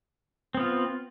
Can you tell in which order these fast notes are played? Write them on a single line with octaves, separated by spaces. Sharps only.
C4 B3 F4